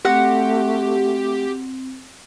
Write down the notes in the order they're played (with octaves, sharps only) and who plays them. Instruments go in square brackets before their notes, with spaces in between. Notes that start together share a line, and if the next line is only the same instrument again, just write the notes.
[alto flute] A3 [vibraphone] C4 [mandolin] F#4 F#5 [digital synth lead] G4